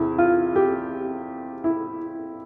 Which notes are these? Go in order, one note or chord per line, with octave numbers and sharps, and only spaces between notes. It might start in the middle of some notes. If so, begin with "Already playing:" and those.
Already playing: E2 C3 E4
F4
G4
E4